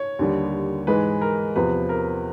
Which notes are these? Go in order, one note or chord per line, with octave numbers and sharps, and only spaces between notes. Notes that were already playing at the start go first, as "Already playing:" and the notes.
Already playing: C#5
D#2 D3 G3
G#2 E3 G#3 B4
A#4
E2 C3 F3 B4
A#4